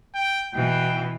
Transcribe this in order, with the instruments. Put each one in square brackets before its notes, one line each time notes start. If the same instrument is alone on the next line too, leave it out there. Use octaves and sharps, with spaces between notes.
[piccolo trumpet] G5
[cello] B2 E3 [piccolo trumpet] G5